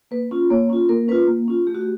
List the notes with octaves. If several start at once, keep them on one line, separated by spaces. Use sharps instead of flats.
A#3 B4
C#4 F4
A#3 C#5
C#4 F4
A#3 A#4
C#4 F4 B4
A#3
C#4 F4
A3 G4
F#4
G4